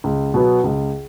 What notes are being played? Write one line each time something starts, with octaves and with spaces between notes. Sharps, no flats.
C#2
B2 F#3 B3
C#2